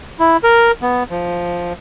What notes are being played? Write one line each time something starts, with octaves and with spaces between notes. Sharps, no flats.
E4
A#4
B3
F3